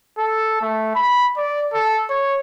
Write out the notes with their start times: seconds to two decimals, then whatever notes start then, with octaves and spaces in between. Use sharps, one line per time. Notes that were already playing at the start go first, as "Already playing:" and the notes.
0.18 A4
0.62 A3
0.95 B5
1.37 D5
1.73 A4
2.10 C#5